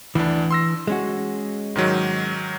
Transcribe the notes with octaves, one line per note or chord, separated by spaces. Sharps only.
D2 E3 D4
C6 E6 A#6
G#3 C#4 F#4
G#2 D#3 F#3